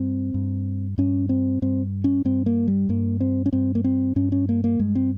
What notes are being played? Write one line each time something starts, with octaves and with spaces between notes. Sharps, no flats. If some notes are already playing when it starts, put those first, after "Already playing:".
Already playing: G2 C4
G2
G2 C#4
C4
G2 C4
C#4
G2 C4
A#3
G3
G2 A#3
C4
C#4
G2 C4
A#3
C4
G2 C#4
C#4
A#3
A#3
G2 G#3
C4